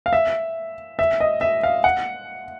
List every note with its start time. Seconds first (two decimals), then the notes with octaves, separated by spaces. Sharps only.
0.06 F5
0.13 E5
0.99 E5
1.20 D#5
1.41 E5
1.63 F5
1.84 F#5